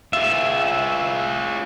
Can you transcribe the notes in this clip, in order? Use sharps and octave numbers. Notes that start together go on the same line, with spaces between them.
F4 G#4 E5